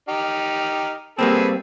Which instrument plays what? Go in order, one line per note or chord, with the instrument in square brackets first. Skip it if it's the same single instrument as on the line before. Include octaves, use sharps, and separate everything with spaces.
[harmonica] D#4 G4 F6
[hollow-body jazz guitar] G3 A#3 C4 [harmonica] G#4 A4 B4